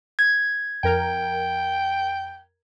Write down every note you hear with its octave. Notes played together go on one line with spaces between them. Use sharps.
G#6
F2 A#4 G5